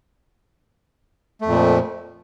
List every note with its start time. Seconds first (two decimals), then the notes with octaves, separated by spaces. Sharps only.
1.41 A3
1.45 F2
1.49 A#2
1.53 F3